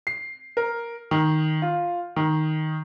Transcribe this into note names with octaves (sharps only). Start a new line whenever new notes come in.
C7
A#4
D#3
F4
D#3